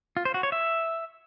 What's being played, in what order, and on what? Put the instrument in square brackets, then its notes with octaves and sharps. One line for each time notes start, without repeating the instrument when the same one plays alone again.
[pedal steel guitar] F4
C5
F#4
C#5
E5